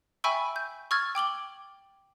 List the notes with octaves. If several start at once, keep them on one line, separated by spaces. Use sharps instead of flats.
E5 G5 G#5 B5 C#6 E6
G6
C#6 E6 F6 G#6 A6
G5 D6 F#7 G7